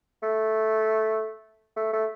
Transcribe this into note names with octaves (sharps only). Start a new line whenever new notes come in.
A3
A3
A3